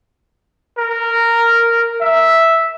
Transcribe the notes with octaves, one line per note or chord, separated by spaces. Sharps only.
A#4
E5